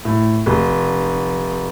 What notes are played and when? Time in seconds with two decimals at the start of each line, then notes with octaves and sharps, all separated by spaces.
0.05 A2
0.46 F1